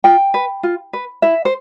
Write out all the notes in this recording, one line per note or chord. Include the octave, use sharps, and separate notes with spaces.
F4 G5
B4
F4
B4
E4 E5
C5